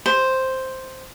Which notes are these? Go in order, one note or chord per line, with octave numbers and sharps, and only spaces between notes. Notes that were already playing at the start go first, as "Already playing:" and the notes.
C5